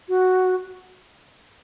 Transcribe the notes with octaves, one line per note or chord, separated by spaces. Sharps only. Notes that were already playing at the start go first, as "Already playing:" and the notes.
F#4